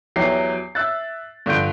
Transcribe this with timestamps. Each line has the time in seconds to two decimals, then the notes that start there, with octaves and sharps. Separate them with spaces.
0.16 E2 F#3 G4 E5 C7
0.75 E5 E6 F#6 A6
1.46 G2 D3 F3 G6 D7